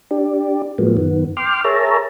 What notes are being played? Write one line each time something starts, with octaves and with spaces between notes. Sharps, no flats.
D4 G4
A2 F3 F#3 G#3 A#3 B3
F#2 D#3 B3
G5 C6 D6 F6
G#4 A#4 C#5 E5 A5 A#5